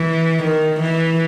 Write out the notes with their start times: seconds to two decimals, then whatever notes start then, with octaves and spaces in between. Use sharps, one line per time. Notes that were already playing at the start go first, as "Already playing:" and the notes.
Already playing: E3
0.43 D#3
0.80 E3